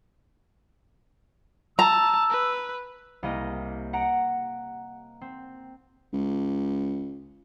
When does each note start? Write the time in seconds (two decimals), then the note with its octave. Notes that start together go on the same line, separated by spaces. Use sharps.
1.79 A5 A#5 E6
2.30 B4
3.23 C2 A#3 D#5
3.93 F#5 A#5 C#7 D7
5.21 C4
6.13 C#2